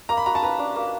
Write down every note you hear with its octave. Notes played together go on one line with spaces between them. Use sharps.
A#3 A#5
B5
F#4 A#5
A5
B4 A#5
D4
A#3